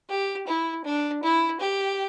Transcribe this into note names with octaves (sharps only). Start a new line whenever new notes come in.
G4
E4
D4
E4
G4